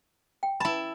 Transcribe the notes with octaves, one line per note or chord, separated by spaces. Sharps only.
G5
E4 A5 B5